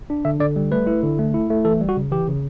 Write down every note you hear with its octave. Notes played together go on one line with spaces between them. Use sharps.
D4
D3 E5
D3 D5
G3
A3 B4
E4
D3
A3
E4
A3
E3 A4
G3
F#4
C#3
E3 G4
C#3